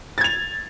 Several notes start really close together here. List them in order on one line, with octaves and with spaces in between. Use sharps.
A6 G#6 F7